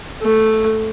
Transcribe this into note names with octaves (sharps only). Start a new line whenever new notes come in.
A3